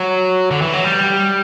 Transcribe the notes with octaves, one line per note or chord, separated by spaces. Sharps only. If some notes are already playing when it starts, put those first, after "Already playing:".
Already playing: F#3
D3
E3
F#3
G3